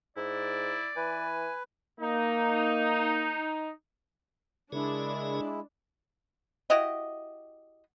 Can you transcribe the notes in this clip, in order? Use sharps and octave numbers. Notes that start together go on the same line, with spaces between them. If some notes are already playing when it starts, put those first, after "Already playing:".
G#2 E4 D5
E3 B4 G#5
A#3 D#4
C#3 G#3 D4 E4 G#4 A#4
E4 F#4 G4 D#5